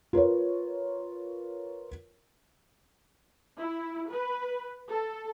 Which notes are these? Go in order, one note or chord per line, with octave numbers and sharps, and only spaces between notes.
F4 A#4 B4 C#5
E4
B4
A4